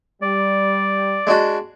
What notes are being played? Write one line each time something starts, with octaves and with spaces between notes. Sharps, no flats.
G3 D5
G#3 D4 F#4